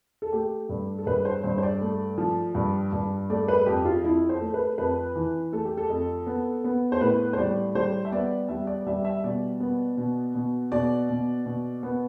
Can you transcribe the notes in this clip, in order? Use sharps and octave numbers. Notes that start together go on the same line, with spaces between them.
A4
A3 G4
G2
A4
G2 B4
C5
G2 C5
C5
D5
A3
F3
G2
G2
A3 D5
B4
F2 G4
F4
F2 E4
C5
A3
B4
F2 B4
E3
A3 A4
G4
A4
F2
B3
B3
C5
A2 B4
C5
G3 D5
G3 C5
E5
B3 D5
G3 E5
D5
G3 E5
E5
B2 D5
B3
B2
B2
B2 D5
B2
B2
B3